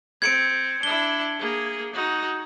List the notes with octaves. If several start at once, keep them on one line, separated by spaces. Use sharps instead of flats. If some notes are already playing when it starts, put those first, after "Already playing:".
C4 G#6 C#7 D7
D4 E4 G7
A#3 G#4
D#4 F#4